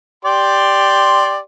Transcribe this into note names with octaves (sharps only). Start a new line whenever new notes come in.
G4 D5 C6